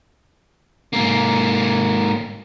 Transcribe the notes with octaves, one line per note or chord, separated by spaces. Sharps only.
G#2 A#3